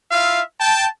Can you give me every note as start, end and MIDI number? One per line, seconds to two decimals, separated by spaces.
0.11 0.41 64
0.11 0.41 65
0.11 0.41 76
0.11 0.41 77
0.60 0.85 79
0.60 0.85 81